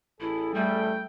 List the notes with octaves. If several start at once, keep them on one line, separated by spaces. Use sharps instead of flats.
A1 E4 G#4 A4
G3 A3 G5